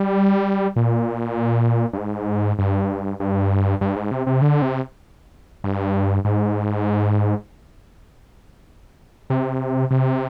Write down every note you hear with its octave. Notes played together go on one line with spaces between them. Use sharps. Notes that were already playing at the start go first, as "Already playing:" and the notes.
Already playing: G3
A#2
G2
G#2
G2
G2
G2
G#2
C3
C3
D3
C3
G2
G#2
C3
C3